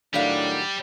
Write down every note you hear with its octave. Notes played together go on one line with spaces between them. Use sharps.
A2 D#3 F#3 G3 D4 F5